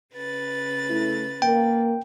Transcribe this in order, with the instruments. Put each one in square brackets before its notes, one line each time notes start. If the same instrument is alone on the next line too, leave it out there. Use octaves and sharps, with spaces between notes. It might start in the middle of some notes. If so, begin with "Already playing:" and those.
[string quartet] C#3 B4 A6
[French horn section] A3 E4
[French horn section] A#3 [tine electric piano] G5